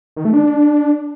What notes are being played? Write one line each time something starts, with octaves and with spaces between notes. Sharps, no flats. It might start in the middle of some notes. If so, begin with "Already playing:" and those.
D#3
A3
D4